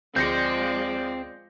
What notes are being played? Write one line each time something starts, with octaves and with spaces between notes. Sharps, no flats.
D2 F3 G#3 C4 D5 G6 A#6 C#7